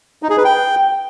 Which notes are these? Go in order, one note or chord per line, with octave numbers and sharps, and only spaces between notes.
D#4
G#4
B4
G5